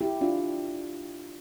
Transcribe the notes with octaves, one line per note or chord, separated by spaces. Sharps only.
E4 G4
D4 F4